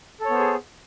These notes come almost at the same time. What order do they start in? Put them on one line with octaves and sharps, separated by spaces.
A4 C#5 B3 C5 G#4